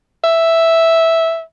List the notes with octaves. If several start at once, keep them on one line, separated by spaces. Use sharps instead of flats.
E5